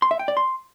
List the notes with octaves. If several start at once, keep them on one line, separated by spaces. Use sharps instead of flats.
C6
E5
G5
D5
C6